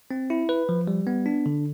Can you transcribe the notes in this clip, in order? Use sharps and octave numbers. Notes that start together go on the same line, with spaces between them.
C4
E4
B4
F3
G3
B3
D4
D3